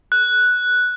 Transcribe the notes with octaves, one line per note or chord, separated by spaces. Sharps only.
F#6